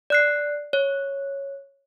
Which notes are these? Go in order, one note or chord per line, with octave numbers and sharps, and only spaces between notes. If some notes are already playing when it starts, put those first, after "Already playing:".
D5 F#6 C7
C#5